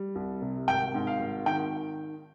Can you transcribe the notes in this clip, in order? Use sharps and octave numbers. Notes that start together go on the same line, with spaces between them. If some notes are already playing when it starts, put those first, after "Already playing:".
Already playing: G3
C2
C3
G#1 G5
G#2
F5
G#1
D#3 G5